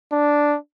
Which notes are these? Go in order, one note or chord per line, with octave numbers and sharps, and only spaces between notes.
D4